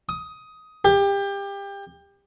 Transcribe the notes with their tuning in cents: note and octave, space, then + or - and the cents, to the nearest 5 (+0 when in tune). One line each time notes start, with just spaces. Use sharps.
D#6 +15
G4 +25